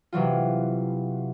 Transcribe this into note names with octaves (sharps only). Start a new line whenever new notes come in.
C3 E3 F#3 F4